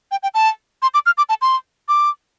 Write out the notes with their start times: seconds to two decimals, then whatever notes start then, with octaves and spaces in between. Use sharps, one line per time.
0.11 G5
0.23 G5
0.34 A5
0.82 C6
0.94 D6
1.06 F6
1.18 D6
1.29 A5
1.42 C6
1.88 D6